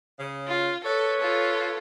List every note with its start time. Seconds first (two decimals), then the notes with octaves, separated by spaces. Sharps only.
0.18 C#3
0.47 F4
0.84 A4 B4 C#5
1.21 F4 A4